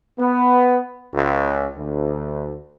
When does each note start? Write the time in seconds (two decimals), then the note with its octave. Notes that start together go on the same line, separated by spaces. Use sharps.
0.19 B3
1.13 C#2
1.76 D2